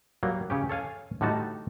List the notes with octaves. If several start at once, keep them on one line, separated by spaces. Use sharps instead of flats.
F#3 G3 A#3
C#3 C#4 G4
A4 C#5 F5 G#5
A2 D3 G3 D#4 F#4 A5